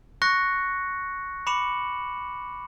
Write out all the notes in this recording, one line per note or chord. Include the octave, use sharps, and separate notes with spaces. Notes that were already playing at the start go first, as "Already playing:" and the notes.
C#6 F#6 A#6 C#7
B5 D6 C#7 E7 F#7